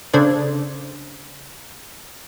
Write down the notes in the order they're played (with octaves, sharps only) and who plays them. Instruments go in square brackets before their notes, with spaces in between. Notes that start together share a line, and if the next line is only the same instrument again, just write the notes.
[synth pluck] C#3 D4 A4 C5 D5 G#6